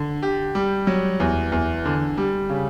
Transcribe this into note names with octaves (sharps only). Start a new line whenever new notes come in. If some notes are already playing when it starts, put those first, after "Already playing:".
Already playing: D3
G4
G3
F#3
E2
E2
D3
G3
C#3